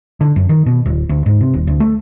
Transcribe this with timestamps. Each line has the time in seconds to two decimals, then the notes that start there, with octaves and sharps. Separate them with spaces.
0.21 D3
0.36 F#2
0.49 D#3
0.66 B2
0.86 D1
1.09 D2
1.26 G#2
1.41 C3
1.54 D#1
1.67 D2
1.80 A3